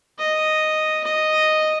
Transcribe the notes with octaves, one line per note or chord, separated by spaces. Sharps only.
D#5
D#5